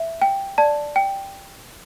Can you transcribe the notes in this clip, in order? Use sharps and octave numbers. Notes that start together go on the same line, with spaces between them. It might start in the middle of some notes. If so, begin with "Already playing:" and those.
Already playing: E5
G5
D5 A5
G5